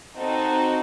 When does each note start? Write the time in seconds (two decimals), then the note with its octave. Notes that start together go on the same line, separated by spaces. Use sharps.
0.16 C4 D#4 F#4 A4